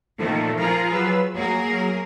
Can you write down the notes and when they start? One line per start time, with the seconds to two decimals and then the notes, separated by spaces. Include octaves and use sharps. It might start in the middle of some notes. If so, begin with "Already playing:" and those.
0.18 A#2 D#3 F3 A3 A4
0.56 F3 F4 G#4 A#4 A#5
0.92 F#3 B4 E6
1.35 F#3 A#3 G#4 A#4